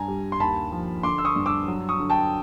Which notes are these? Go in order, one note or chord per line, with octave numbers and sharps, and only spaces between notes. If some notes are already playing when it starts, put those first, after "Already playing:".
Already playing: G2 G#5 A#5
G3
C6
D#2 A5 B5
F3
D3 C6 D6
E6
C#6 D#6
G2
D6 E6
F#3
C#6 D#6
D3
G5 A5